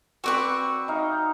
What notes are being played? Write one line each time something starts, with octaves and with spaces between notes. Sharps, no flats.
C4 F#4 B4 D5 C#6
D#4 F5